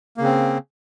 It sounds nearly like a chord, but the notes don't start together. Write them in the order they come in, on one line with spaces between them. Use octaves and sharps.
A#3 C#3 C4